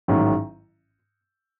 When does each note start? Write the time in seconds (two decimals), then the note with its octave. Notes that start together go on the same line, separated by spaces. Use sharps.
0.08 A1 G#2 D#3 F#3